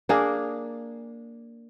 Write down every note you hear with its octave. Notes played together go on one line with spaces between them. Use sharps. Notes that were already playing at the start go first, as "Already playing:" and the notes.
A#3 D4 G#4 A#4